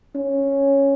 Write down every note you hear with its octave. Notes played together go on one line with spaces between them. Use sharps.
C#4